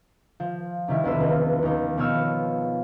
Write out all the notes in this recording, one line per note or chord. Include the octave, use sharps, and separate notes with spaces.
F3
C3 D#3 G3 E4
E1 B1 B3 B4 C5 E6
C#2 C#3
D#2 D#4
B2 F3 B3 C#5 F5 E6